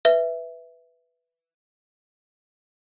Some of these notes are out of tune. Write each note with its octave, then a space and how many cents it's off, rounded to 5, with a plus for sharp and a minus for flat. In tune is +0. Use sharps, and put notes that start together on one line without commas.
B4 +0 E5 +0